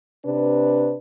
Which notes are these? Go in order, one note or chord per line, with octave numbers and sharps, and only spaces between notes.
C3 D4 B4